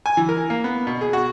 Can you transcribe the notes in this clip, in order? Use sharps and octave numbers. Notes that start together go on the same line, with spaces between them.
G#5
E3
A#4
A#3
B3
B2
G#4
F#4